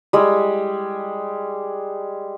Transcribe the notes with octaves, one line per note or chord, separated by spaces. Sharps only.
G3 G#3